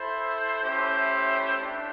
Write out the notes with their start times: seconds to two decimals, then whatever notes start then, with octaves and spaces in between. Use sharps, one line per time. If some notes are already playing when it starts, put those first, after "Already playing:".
Already playing: E4 A4 C5
0.62 A3 C#4 E4 G4 C5
1.57 A3 D4 G4